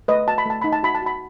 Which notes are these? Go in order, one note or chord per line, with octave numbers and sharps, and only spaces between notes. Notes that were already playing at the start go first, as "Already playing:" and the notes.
A3 B4 D#5
F#4 A5
B5
A3 A5
D#4 B5
A5
F#4 B5
A5
F#4 B5